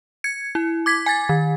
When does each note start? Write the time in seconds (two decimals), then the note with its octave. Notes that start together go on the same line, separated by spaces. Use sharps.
0.24 G#6 C#7
0.55 E4
0.86 D6 G#6 B6
1.06 G#5 G#6 A6
1.29 D#3